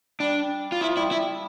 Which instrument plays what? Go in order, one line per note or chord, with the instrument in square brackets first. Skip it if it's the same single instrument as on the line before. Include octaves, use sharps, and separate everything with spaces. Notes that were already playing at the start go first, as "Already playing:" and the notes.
[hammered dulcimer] G3 [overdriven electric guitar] D4
[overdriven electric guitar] F4
[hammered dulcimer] F3 [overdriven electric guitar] E4
[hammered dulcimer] G3 [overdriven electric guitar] E4
[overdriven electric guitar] E4